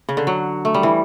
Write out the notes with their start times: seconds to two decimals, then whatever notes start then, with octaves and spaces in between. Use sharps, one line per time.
0.09 C#3
0.17 D3
0.27 F#3
0.65 A3
0.74 G3
0.83 E3